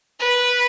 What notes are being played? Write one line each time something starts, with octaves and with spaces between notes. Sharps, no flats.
B4